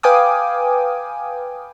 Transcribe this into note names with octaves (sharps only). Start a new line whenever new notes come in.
B4 F5 G5 G#5 D6 D#6